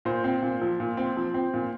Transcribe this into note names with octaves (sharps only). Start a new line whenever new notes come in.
A#2 C5
C4
A#2
F3
A#2
C4
F3
C4
A#2